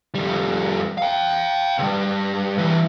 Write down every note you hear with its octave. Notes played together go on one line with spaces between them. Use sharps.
F2 G3
F5 G5
C2 G2
E3 G3